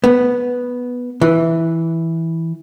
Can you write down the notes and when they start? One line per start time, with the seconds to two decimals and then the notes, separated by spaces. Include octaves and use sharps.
0.04 B3
1.21 E3